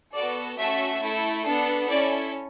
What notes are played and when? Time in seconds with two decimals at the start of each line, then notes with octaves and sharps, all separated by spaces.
0.14 B3 F#4 A4 D5
0.59 A3 C#4 F#4 A4 E5
1.02 A3 E4 A4
1.45 B3 D4 A4
1.88 C#4 E4 A4 D5